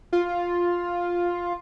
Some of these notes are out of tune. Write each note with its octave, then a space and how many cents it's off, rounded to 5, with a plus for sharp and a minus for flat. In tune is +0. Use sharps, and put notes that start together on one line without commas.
F4 +5